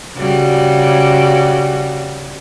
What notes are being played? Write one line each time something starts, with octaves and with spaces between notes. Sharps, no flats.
C#3 G3 F#4